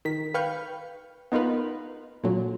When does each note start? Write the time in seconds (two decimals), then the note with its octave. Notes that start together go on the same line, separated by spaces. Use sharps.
0.05 D#3 B6
0.34 B4 F5 G5 C#6 F6 G6
1.32 B3 D#4 F4 A#4 B4
2.24 A#2 D3 F#3